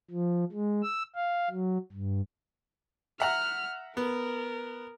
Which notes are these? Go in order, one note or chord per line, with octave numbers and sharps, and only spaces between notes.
F3
G#3
E6
F5
F#3
G2
E5 F#5 A#5 F6
B3 A#4